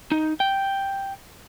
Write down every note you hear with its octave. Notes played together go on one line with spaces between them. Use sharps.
D#4
G5